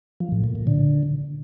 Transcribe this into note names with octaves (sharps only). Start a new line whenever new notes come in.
F3
A2
A#2
A#2
D3